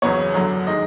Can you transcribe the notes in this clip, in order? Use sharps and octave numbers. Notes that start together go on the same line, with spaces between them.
E2 C#3 F#3 B3 C#5
F#2 D3 F#3
D#3 G#3 D#5